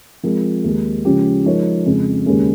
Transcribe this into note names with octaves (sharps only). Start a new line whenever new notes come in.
F3 G#3 C4 F4 A#4
D#2 D#3 G#3
C#3 F3 G#3 C#4 G4
F3 G#3 D#4 A#4 C#5
F2 C#3 G#3
D#2 C#3 G#3 C#4